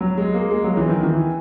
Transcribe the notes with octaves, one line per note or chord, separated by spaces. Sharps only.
F#3
G#3
A#3
G#3
F#3
E3
D#3
E3